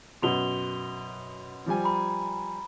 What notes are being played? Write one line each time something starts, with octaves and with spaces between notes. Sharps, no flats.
F#2 B2 C6 F7 G7
F3 G3 G#5
A#5 B5